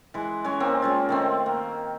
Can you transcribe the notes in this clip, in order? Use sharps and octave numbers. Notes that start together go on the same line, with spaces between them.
E3 G#3
G#3 C#4 C#5 G#5
A#3 C4
G#3 C#4 F4
D#3 A3 C4
A#3